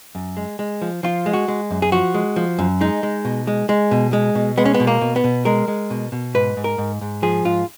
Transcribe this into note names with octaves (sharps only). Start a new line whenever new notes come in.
F#2
G#3
G#3
F3
F3 F4
G#3
F#4
G#3
F#2
G#4
F3 F#4
G#3
F3
F#2
G#3 D#4
G#3
B2
G#3
G#3
B2
G#3
B2
G#3 B3
C#4
B3
B2
A#3
B2
B3
B2
G#3 A#4
G#3
B2
B2
G#2 B4
G#2
A#4
G#2
G#2
F3 G#4
G#2 F4